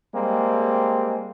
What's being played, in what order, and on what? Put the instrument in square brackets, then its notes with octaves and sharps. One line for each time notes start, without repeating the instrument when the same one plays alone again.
[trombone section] G3 G#3 A#3 C4